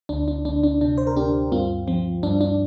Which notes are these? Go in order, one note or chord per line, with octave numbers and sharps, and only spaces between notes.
D2 D4
D4
D2 D4
D4
C3 D4
C5
A#4
D2 D4 G4
G2 C4 F4
F3 C4
G2 D4
D4